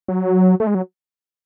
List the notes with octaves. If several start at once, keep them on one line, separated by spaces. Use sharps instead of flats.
F#3
A3
G#3
F#3